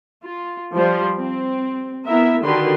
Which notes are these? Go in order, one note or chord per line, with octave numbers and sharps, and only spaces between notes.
F4
F3 G3 C5
C4
B3 E4 A#4 E5
D3 D#3 F#4 G4 B4 C6